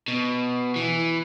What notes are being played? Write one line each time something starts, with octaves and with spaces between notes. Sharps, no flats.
B2
E3